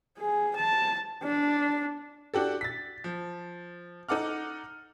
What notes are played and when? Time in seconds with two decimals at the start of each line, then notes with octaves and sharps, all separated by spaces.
0.19 G#4
0.56 A5
1.23 D4
2.34 D4 F#4 G4 A4
2.61 A6 B6
3.04 F3
4.09 D#4 A4 F#5 D6 F6